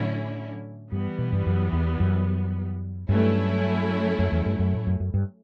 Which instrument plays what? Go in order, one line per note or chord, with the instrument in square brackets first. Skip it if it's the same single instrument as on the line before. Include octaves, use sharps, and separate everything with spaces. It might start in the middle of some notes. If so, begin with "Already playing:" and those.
Already playing: [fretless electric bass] A2 [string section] D3 F#3 C#4 E4
[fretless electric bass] G2 [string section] E3 G3 B3
[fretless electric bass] B2
G2
F#2
E2
F#2
[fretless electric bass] G2 [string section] F#3 A3 C#4 E4
[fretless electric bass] F#2
E2
G2
F#2
A2
F#2
F#2
G2